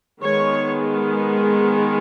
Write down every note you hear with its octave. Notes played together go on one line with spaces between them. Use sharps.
D#3 G#3 B3 C#5